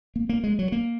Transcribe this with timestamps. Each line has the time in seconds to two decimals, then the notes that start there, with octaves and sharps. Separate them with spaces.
0.16 A#3
0.29 A#3
0.44 G#3
0.59 F#3
0.72 A#3